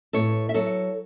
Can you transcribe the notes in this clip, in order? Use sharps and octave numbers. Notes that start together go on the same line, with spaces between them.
A2 A4 C#5
E5
F#3 A4 C#5